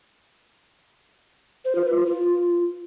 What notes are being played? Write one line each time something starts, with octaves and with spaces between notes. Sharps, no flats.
C5
F4
B4
F4
F4